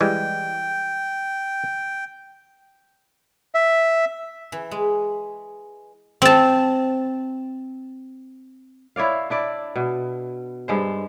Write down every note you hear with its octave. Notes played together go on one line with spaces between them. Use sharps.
E3 G3 G#3 G5
E5
E3
G#3
C4 A5
E4 C#5 D5 F5
D4 E4 D5
B2
G2 G#3 C5